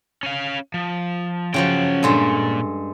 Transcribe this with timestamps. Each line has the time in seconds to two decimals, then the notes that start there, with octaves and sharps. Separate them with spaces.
0.23 C#4 F5
0.74 F3
1.54 C#3 F3 F#3 C#4 G5
2.03 G2 A#2 G#3 A4